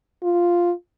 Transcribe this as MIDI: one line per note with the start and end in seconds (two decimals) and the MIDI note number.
0.23 0.72 65